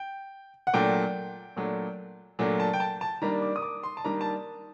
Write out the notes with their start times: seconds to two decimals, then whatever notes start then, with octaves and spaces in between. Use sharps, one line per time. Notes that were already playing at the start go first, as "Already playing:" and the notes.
Already playing: G5
0.67 F#5
0.74 A#2 F#3 A3 D4 G5
1.57 A#2 F#3 A3 D4
2.39 A#2 F#3 A3 D4
2.60 A5
2.74 G5
2.80 A5
3.01 A5
3.22 D#3 G3 A#3 D4 A#5
3.42 D6
3.56 D#6
3.62 D6
3.83 C6
3.97 A5
4.04 D#3 G3 A#3 D4 A#5
4.21 A5